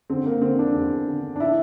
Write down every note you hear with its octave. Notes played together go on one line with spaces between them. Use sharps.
D3 C4
A#3
D3 C4
D4
E2
D3
D4
E4